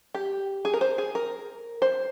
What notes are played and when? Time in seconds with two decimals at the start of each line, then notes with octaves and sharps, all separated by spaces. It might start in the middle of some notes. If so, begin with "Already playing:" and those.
0.15 G4
0.65 G#4
0.74 A#4
0.81 C5
0.98 G#4
1.15 A#4
1.82 C5